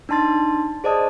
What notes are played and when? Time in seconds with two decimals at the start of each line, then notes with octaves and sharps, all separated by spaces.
0.09 D4 D#4 A5 C6 A6
0.84 G#4 C5 D5 D#5 A5 D#6